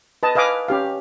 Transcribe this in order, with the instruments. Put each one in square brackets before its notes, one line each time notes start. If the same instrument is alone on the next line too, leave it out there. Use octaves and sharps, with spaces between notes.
[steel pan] B4 D#5 A5
B4 D#5 F5 G#5 D6
C#4 G4 F5